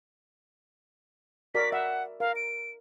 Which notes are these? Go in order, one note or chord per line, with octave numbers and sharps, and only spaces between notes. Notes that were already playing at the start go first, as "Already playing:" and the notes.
F#4 A#4 D5 B6
E5 F#5
A#4 F5
D7